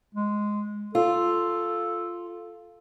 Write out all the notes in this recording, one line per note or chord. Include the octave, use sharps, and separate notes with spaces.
G#3
F4 A4